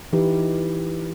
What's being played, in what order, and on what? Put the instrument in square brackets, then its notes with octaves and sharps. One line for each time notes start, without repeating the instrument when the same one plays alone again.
[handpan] E3 D#4 G4 B4